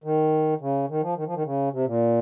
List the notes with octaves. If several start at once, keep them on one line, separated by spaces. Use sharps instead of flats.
D#3
C#3
D#3
F3
D#3
F3
D#3
C#3
C3
A#2